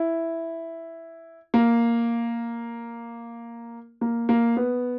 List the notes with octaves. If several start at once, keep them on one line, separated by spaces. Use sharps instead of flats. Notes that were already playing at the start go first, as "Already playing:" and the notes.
Already playing: E4
A#3
A#3
A#3
B3